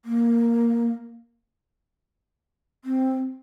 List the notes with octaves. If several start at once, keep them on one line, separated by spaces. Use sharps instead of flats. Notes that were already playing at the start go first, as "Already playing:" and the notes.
A#3
C4